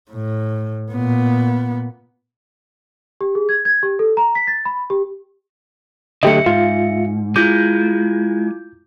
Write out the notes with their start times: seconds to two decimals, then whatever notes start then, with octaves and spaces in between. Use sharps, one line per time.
0.11 A2
0.92 A#2 B3
3.21 G4
3.35 G#4
3.49 G#6
3.65 G#6
3.83 G4
3.99 A4
4.17 A#5
4.35 B6
4.47 A6
4.65 B5
4.90 G4
6.23 D3 F#3 A3 G4 D#5 E5 C#7
6.46 G#2 F4
7.36 G#3 E4 F4 D6 G6